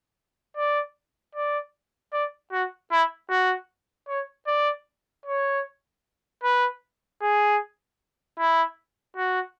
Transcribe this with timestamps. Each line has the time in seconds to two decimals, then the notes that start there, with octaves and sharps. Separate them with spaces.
0.57 D5
1.35 D5
2.13 D5
2.52 F#4
2.92 E4
3.30 F#4
4.09 C#5
4.47 D5
5.26 C#5
6.44 B4
7.22 G#4
8.39 E4
9.17 F#4